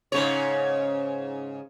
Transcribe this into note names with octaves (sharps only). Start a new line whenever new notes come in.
G#2 C#3 C#5